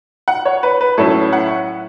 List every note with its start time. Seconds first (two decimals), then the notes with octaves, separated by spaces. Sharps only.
0.28 F#5
0.45 C#5
0.63 B4
0.81 B4
0.97 A2 F#3 C#4 E4 A4
1.33 F#5